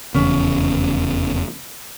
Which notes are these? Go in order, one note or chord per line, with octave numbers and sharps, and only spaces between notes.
F1 E2 C#3 C#4